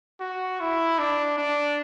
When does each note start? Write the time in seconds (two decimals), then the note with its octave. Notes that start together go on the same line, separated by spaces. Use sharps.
0.20 F#4
0.60 E4
0.99 D4
1.38 D4